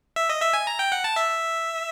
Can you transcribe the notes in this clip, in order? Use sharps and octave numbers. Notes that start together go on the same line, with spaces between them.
E5
D#5
E5
G#5
A#5
G5
F#5
A5
E5